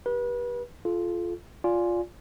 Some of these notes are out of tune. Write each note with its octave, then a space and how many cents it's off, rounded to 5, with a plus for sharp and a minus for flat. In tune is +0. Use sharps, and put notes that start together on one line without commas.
G4 +0 B4 -30
F4 -5 A4 -35
F4 +5 D5 -15 G#5 +0